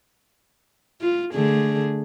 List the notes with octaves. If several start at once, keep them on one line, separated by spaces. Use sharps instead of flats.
F4
D3 A3 G#4